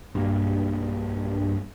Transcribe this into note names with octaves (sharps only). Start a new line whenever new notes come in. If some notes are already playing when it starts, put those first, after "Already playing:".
B1 G2 A#3